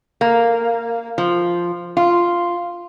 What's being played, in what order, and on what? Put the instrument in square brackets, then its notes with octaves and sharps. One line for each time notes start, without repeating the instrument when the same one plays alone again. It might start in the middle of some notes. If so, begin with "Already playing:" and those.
[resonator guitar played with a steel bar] A#3
F3
F4